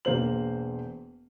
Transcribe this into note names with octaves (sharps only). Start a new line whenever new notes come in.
E1 A#3 C5 F#7